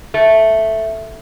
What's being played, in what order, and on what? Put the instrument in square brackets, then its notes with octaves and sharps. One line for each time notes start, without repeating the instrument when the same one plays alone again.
[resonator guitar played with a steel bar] A3